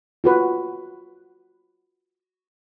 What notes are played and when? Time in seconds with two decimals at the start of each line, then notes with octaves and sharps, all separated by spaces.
0.24 F4 F#4 B4